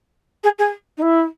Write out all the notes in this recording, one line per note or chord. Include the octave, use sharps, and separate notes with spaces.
G#4
G#4
D#4
E4